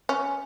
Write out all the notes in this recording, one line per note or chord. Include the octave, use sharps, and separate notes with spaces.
C#4